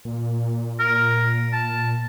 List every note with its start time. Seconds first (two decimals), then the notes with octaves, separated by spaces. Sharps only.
0.05 A#2
0.79 A#4
1.53 A5